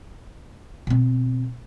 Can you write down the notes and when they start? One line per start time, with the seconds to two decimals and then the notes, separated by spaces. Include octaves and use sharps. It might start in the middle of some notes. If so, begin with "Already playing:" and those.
0.87 B2 C4